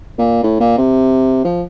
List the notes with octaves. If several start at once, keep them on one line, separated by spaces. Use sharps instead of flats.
A#2
A2
A#2
C3
F3